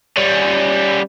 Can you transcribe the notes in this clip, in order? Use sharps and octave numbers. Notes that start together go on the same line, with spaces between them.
G3 C#4